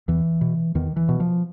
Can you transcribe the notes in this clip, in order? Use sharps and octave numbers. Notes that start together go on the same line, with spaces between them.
E2 E3
B2
E2 D#3
E3
B2
F3